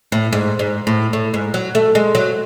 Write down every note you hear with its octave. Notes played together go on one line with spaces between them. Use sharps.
A2
G#2
G#2
A2
A2
G#2
F#3
A3
G#3
F#3